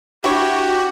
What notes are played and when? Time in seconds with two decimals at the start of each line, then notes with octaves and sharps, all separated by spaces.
0.24 D4 E4 F#4 G4 C#5